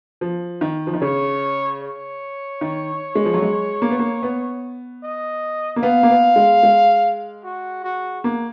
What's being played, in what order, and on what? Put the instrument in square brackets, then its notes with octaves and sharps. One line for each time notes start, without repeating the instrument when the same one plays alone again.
[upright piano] F3
D#3
F3
D#3
[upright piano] C#3 [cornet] C#5
[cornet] C#5
[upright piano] D#3
G#3
F3
F#3
G#3
A#3
B3
A#3
B3
[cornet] D#5
[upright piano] A#3
[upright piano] B3 [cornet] F5
[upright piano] A#3
B3
G#3
G#3
[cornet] F#4
F#4
[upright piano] A#3